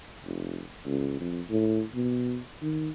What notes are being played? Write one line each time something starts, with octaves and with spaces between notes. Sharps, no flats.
F1
C#2
F2
A2
B2
D#3